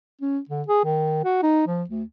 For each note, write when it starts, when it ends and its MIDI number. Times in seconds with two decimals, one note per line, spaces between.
0.21 0.38 61
0.49 0.63 50
0.68 0.83 68
0.84 1.23 51
1.24 1.41 66
1.43 1.65 63
1.67 1.84 53
1.90 2.03 38